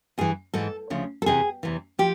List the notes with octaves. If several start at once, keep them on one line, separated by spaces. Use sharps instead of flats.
G2 E3 G#4
G#2 E3 A4
D2 C#3 F3
A4
E2 C3 E3 G#4
E2 C3 E3
F3 G4